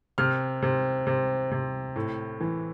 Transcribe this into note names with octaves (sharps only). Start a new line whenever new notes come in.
C3 F6
C3
C3
C3
A2
E3